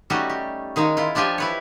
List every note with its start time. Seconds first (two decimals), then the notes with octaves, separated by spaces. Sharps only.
0.10 G3 A3 C#4 D#4 F#4 G4
0.29 G4
0.76 D#3 G#3 D#4 F5
0.97 E4 F4
1.15 F3 D4 F4 G4 G#5
1.38 E4 B4 C#5